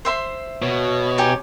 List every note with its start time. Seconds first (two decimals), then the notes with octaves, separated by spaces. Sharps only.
0.05 C5 E5 C6
0.62 B2 C#5
1.18 D#4 G4 G#5